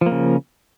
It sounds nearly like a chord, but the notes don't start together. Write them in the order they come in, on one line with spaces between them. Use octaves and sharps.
F3 A#3 C#3